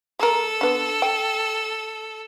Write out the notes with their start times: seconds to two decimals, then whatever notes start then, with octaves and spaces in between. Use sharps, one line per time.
0.19 G#3 A4 A#4
0.61 D3 B3
1.02 G5